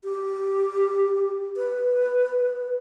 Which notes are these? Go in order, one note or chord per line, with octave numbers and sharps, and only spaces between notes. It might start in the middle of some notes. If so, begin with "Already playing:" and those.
G4
B4